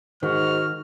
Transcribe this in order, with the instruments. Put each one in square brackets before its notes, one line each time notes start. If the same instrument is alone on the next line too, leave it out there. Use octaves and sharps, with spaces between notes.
[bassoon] G#2 [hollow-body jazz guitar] D#3 [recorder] F#4 [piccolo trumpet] F6